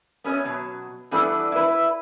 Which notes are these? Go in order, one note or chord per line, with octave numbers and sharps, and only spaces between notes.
B3 C#4 A4 C#5 D#5
B2 F#3
E3 G3 B3 D4 A4 B4
E4 B4